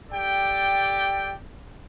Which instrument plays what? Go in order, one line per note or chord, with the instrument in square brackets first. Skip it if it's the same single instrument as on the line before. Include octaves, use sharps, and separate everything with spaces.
[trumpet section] G4 A4 D5 G5